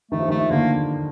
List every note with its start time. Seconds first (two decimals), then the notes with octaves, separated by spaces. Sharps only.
0.11 D#3 A3
0.19 F3
0.28 D#3
0.31 A3
0.50 D3 A#3